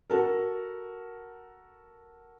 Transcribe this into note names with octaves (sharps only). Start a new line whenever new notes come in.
F#4 A4 A#4